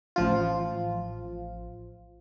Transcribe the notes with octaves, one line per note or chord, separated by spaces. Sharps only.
A1 F3 F4